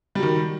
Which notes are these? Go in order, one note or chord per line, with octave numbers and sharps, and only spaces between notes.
D#3 F#3 G3